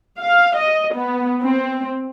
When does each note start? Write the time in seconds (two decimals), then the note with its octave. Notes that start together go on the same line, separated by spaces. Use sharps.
0.19 F5
0.57 D#5
0.96 B3
1.43 C4